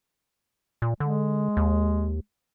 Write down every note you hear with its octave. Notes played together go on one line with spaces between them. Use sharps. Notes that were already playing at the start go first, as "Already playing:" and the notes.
A#2
D3 G#3
D#2